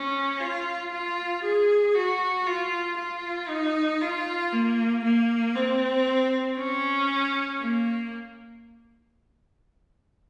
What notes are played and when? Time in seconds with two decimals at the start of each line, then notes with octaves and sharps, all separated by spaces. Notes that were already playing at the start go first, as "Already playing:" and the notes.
Already playing: C#4
0.40 F4
0.92 F4
1.43 G#4
1.94 F#4
2.47 F4
2.98 F4
3.49 D#4
4.01 F4
4.53 A#3
5.04 A#3
5.56 C4
6.58 C#4
7.61 A#3